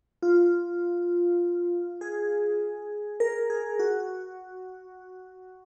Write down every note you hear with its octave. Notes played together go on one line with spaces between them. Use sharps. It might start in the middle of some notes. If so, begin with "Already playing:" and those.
F4
G#4
A#4
G#4
F#4